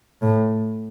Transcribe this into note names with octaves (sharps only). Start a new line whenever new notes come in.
A2